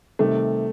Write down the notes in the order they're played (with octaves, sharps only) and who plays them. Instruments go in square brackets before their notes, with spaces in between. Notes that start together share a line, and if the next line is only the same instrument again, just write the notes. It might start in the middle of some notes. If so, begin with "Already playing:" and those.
[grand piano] C3 D#3 G3 [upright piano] A3